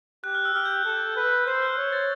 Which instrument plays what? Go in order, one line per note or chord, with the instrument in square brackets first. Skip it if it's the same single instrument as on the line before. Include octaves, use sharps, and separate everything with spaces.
[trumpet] G4 [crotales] F#6
[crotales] F6
E6
[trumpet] G4 [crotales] F6
[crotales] G6
F#6
[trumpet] A4
B4
[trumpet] C5 [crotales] G6
[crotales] E6
F6
[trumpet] C#5
[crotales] A6